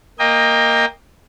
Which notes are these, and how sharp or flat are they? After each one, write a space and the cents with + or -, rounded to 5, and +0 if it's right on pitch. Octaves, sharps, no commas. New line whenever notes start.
A#3 +0 D#5 +0 G5 +30